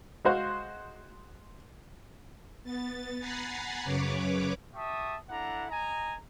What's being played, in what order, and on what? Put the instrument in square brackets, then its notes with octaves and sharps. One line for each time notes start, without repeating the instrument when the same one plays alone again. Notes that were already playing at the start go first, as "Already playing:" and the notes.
[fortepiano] G#3 F#4 C5 F5
[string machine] B3 A6
F#5 G#5 A#5 B5 A6 C7
F#2 C#3 B4 C#5 D6
[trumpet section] G4 E5 A5 C#6 D#6
D4 E4 A4 F#5 A#5
D#5 G#5 A#5